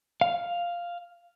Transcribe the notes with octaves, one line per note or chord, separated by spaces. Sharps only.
F5